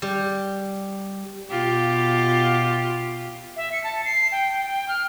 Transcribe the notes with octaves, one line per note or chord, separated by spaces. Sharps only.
G3
B2 F4 G4
E5
C#7
A5
C7
G5
G5
F6